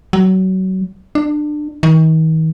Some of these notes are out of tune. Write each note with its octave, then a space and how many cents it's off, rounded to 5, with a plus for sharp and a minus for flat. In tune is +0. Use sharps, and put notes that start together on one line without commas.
F#3 +25
D4 +25
D#3 +40